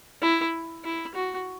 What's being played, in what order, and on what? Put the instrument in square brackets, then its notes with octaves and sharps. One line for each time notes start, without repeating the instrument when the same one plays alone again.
[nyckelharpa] E4
E4
F#4